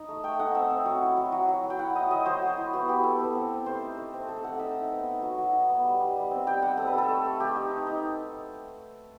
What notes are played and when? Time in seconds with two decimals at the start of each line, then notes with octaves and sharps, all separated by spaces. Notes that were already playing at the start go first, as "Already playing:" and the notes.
Already playing: D#4
0.08 A3
0.23 A3 G5
0.39 D#4 F#5
0.55 C4 E5
0.70 C4
0.86 F#3
1.01 E4
1.17 F#3
1.32 F#3
1.48 F#3
1.63 F#3
1.70 G5
1.79 E4 F#5
1.95 E4 D#5
2.10 F#3 D#5
2.26 F#3 C5
2.42 F#3
2.57 E4
2.73 B3 F#4
2.88 B3 G4
3.04 B3 A4
3.20 B3
3.35 C4
3.50 C4
3.66 A3 C5
3.82 D#4
3.97 A3
4.14 C4
4.29 A3 A4
4.44 D#4 F#5
4.59 D#4 E5
4.75 D#4
4.91 B3
5.06 D#4
5.22 F#3
5.38 F#3
5.53 D#4
5.69 B3
5.84 G3
6.00 G3
6.16 G3
6.31 C4
6.47 G3 G5
6.62 G3 F#5
6.77 C4 A4
6.87 B4
6.94 G3 A4
7.09 A3
7.25 A3
7.40 A3 G4
7.56 D#4
7.71 D#4
7.87 D#4